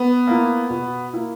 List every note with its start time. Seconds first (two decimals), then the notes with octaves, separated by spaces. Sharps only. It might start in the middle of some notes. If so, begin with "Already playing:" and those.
Already playing: B3
0.27 A#3 E4
0.70 B2
1.13 A#3 E4